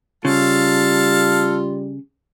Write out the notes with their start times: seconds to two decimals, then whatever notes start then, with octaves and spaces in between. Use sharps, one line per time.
0.25 C#3 G3 F4 A4 F5 A5